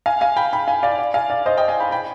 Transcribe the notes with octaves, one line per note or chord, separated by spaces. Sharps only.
F5 G#5
F5 G#5
G5 B5
G5 B5
F5 G#5
D5 F5
D5
F5 G#5
D5 F5
C5 D#5
D#5 G5
F5 G#5
G5 B5
G5 B5